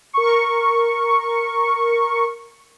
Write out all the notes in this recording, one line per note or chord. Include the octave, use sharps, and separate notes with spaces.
A#4 C#6